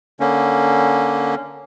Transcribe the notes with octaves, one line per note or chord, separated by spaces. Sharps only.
D3 A#3 C#4